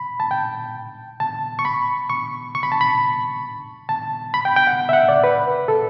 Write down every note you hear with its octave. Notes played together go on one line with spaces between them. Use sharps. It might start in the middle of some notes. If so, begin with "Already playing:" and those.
Already playing: B5
A5
G5
A5
C#6
B5
C#6
C#6
B5
A5
B5
A5
B5
G5
G5
F#5
E5
F#5
D5
B4
A4